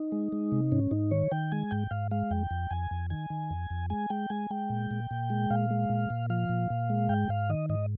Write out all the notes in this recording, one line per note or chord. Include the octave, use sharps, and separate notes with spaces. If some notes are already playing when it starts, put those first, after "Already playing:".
Already playing: D#4
G#3
G#3
C3
G#2 C#4
G#2 D#4
D#3 C#5
D#3 G5
G#3 G#5
G#2 G5
G#2 F5
G#3 F5
F2 G5
F2
F2 G#5
F2
D#3 G#5
D#3
F2
F2
G#3 G#5
G#3 G5
G#3 G#5
G#3 G5
A#2
A#2
A#2
G#3
A#2 F5
G#3
A#2
A#2
F3 F5
A#2
A#2
G#3
G#2 G5
G#2 F5
D#3 D#5
G#2 D#5